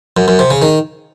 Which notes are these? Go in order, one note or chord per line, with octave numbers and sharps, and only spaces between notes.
F#2
F#2
C3
C#3
D#3